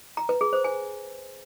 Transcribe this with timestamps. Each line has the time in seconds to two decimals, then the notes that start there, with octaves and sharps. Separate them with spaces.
0.17 A#5
0.29 B4
0.41 G#4
0.53 C5
0.64 G#5